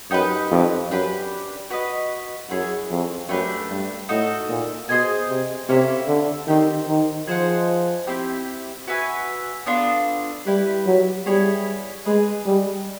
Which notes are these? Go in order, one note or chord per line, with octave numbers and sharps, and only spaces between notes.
F#2 D#4 G4 B4
F2
F#2 D4 G4 B4
F#4 B4 D#5
F#2 E4 G#4 C#5 F#5
F2
F#2 A3 D4 G4 B4
G2
A2 D#4 F#4 A4
A#2
B2 G#4 C5 D#5 G#5
C3
C3 A#3 C#4 E4 A4
D3
D#3 C4 D#4 G4
D#3
F3 G#4 C5 D#5 F#5
C4 E4 G4
F#4 B4 E5 G#5
B3 D4 F4 A4
G3 E4 G4 B4
F#3
G3 B3 E4 G#4 C#5
G#3 G#4 B4 D#5
G3